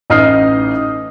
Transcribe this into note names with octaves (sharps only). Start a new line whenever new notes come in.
A1 D#4 D#5 D#6 F6 C7